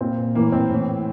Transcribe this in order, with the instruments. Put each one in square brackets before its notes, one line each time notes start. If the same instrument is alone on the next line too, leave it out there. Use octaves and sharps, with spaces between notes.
[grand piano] A#2 C4
A2 E3 A#3
C4
A2 E3